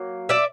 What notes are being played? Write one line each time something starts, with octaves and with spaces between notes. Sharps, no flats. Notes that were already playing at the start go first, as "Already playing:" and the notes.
Already playing: F#3 A#3
D5 E5